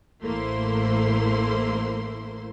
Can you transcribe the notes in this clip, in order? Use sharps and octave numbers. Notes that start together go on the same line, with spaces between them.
A1 A3 A#3 E4 C5 C6